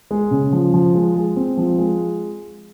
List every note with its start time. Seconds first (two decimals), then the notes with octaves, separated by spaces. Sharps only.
0.11 G#3
0.31 C#3
0.53 F3
0.74 F3
0.95 G#3
1.15 G#3
1.36 C4
1.57 F3
1.79 G#3